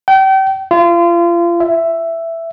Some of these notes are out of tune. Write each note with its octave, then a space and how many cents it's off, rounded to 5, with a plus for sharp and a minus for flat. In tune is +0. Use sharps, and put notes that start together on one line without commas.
G5 -35
F4 -30
E5 +5